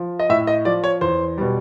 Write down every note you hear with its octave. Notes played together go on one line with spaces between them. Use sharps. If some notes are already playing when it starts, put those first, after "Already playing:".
Already playing: F3
D#5
A2 E5
D#5
F3 D5
C#5
E2 C5
B2 G3